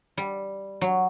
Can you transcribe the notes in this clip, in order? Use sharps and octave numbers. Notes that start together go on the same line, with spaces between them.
G3
F#3